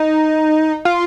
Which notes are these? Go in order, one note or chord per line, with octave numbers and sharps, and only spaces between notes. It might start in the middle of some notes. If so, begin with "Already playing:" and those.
Already playing: D#4
F4